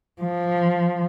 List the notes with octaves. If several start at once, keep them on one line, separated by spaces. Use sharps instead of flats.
F3